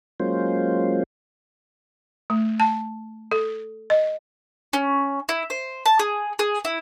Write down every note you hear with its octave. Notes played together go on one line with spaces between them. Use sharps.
F#3 G#3 A#3 C#4 F4 C5
A3
A5
A4
D#5
C#4
E4
C5
A5
G#4
G#4
E4